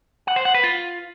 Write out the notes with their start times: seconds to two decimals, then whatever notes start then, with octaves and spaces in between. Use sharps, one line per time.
0.27 F#5
0.36 C5
0.45 F#5
0.54 B4
0.64 F4